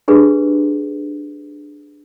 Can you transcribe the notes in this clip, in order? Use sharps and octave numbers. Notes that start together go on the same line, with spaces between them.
D4 G4 G#4 B4